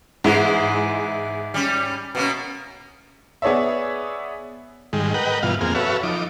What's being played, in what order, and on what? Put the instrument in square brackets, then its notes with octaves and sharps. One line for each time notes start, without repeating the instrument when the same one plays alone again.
[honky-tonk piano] G#2 E4 [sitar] E3 G#3
[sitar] G3 C#4
B2 A#3 C#4
[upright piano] B3 G#4 C#5 D5 E5
[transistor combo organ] G#2 D#3 G3 G#3
A#4 B4 D#5 F#5 G5
G2 B2 E3 F4 F5
F2 A#3 C4 G#4 F6
F#4 A4 B4 C#5 E5 F5
F3 D#4 D6